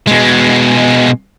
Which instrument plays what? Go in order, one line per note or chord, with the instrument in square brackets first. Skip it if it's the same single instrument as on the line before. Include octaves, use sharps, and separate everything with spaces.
[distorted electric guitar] B2 G#3